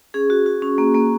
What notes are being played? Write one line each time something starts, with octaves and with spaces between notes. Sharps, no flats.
C#4 G#4
F#4
F#4
C#4
A#3
A#3